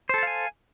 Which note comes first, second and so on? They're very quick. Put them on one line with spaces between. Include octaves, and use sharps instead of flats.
C5 A4 A5 F5 G#5